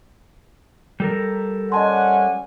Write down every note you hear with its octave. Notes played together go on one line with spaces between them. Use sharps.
G3 A4 A#4
C#4 D5 D#5 F#5 G#5 A5 C6